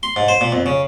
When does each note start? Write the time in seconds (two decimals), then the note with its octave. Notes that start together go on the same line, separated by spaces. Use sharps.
0.03 C6
0.16 G#2
0.28 C5
0.41 A#2
0.52 F2
0.66 C#3